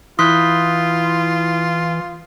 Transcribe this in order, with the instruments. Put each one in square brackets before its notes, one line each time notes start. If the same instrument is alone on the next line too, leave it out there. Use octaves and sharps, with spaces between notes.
[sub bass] E3 [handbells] E4 C6 B6 [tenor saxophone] F4 [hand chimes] D#6 F#6 G6